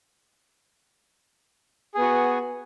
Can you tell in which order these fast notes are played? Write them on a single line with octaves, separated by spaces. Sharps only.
G#4 B3 F#4